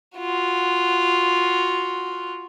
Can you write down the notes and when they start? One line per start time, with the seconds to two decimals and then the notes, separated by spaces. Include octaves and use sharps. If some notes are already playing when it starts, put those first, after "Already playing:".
0.18 F4 F#4